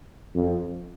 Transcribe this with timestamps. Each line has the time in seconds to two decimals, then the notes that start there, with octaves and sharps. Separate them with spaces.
0.35 F2